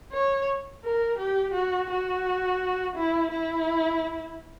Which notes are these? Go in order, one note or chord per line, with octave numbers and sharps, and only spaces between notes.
C#5
A#4
G4
F#4
F#4
E4
E4